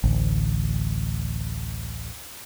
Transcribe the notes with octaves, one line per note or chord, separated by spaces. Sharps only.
A1 D2